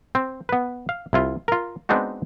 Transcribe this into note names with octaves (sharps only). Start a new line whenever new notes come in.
C4
B3 B4
F5
C2 E4 F4
F4 A#4
G#3 B3 C4 D4 D#4 F#4